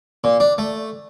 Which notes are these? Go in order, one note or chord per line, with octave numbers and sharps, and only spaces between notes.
A#2
D4
A3